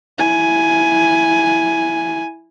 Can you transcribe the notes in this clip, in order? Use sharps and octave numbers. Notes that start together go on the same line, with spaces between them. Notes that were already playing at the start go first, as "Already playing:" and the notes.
E4 G#5